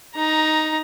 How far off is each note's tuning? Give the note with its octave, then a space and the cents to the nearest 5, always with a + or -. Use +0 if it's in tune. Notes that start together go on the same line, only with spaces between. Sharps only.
D#4 +0 A#5 +10